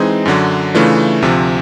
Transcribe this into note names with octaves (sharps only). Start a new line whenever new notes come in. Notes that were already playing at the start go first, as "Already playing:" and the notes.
Already playing: E3 G#3 C4 D#4 G#4
F#2 D3 F#3
C#3 E3 A3 D4 F4
D2 C3 F3